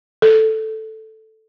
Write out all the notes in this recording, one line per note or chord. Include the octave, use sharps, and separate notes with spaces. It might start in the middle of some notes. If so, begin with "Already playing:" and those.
A4